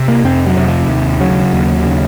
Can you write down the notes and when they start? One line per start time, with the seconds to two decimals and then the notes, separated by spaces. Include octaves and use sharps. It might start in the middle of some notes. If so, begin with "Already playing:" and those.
Already playing: C3
0.08 A#3
0.24 F2 C4
0.46 F#3
0.57 C3
0.68 F3
0.88 D#2
1.21 C#3 F#3
1.53 D#2
1.86 C#3